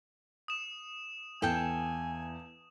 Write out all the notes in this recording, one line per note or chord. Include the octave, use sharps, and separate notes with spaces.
D#6 E7
E2 A4 F5 G5 G#5